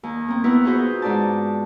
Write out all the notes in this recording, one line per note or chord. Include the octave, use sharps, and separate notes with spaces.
D#2
A#3 C4
B3 E4 A#4 B4
D#4 F4 F#4 G#4 B4 C5
G#2 D5 A5